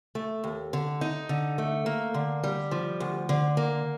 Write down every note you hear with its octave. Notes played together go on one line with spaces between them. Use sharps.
A3
D#2
D3
D#4
D3
A3
A#3
D3
G3
F3
D2
D3
A#3